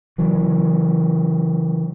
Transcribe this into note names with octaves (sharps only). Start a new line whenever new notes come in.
C#3 E3 F#3